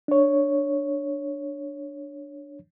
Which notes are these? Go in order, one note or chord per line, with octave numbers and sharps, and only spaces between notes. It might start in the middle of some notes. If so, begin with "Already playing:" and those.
D4 C#5